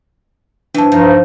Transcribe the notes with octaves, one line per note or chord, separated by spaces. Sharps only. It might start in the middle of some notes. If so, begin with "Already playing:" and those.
G2 E3 D4 A5
G2 F3 D#4